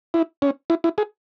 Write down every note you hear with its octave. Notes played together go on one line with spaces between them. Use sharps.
E4
C#4
E4
E4
G#4